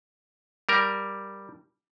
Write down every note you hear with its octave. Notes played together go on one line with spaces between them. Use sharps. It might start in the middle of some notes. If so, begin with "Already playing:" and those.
G3 A#4